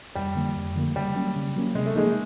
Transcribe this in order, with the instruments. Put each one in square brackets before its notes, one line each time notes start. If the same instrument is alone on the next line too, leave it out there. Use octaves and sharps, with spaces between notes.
[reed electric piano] F2 [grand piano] G3
[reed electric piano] D3 F3 A#3
F2
D3 F3 A#3
[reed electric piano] C#3 [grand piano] G3
[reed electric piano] F#3 A#3 C#4
C#3
F#3 A#3 C#4
[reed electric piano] C3 [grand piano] G#3
[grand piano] A3
[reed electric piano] F3 A#3 D#4 G#4 [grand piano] G#3